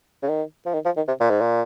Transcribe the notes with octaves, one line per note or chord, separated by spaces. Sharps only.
C#3
D#3
F3
D#3
F3
D#3
C3
A#2
G#2
A#2